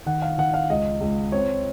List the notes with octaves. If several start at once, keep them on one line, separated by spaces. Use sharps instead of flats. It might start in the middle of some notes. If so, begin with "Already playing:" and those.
D#3 F#5
F5
D#3 F#5
F5
C#2 D#5
C#2
C4 C#5